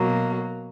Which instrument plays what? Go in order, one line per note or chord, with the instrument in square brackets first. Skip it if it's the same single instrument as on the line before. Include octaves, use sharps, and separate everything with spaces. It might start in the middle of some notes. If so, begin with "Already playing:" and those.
Already playing: [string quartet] B2 F#3 A#3